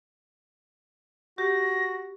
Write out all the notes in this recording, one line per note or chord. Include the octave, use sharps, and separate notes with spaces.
F#4 G4 A#6